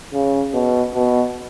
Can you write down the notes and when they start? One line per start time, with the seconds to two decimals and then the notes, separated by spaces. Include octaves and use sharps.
0.13 C#3
0.54 B2
0.94 B2